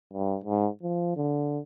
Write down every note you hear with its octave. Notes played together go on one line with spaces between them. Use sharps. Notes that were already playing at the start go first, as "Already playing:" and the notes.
G2
G#2
F3
D3